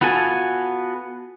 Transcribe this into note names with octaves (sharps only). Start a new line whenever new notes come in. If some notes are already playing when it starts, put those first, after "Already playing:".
B3 F4 F#4 A4 G#5